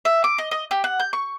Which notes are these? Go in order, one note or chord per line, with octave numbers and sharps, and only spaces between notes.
E5
D6
D#5
D#5
G4
F#5
G6
C#6